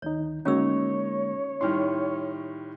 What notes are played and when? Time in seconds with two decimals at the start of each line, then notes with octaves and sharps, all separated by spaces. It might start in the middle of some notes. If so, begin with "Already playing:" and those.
0.02 D2 D#3 D#4 C#5
0.45 D3 G#3 A#3 C#4 D#4 F#4 C#5 E6
1.61 A2 D#3 G3 C6 F6